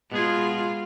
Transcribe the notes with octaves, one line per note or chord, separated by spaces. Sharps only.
B2 G#3 B3 F4 G#4